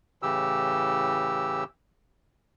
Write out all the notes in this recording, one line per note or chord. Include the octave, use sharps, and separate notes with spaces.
A2 C#3 E3 G4 E6